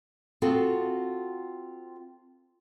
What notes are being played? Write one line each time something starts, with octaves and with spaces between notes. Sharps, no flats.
C4 F4 F#4 G#4 A4